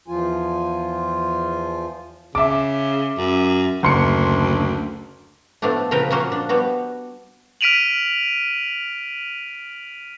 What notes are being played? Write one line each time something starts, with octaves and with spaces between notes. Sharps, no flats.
E2 F3 F4 G#5
C#3 E5 D6
F#2
F#1 D2 C6 C#7
A2 F3 A3 B3 D4
A#2 C#3 F3 A#4 B4 G5
F3 A#3 C#4 F#4 C5
D4
G3 B3 F#4
F6 B6 D7 D#7 F7 F#7